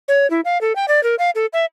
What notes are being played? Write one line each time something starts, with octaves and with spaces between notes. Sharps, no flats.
C#5
E4
F5
A4
G5
D5
A#4
F5
A4
E5